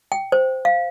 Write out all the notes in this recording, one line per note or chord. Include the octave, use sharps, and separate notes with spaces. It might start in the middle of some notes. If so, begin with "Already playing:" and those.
G5
C5
F5